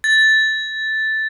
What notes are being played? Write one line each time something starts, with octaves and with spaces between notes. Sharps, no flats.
A6